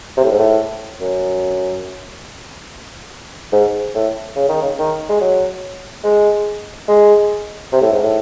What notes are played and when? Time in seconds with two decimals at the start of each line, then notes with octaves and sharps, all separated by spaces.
0.17 C3
0.24 A2
0.31 G#2
0.39 A2
1.01 F#2
3.52 G#2
3.95 A2
4.36 C#3
4.49 D#3
4.62 C#3
4.79 D#3
5.09 G#3
5.21 F#3
6.04 G#3
6.88 G#3
7.72 C3
7.82 A2
7.93 G#2
8.03 A2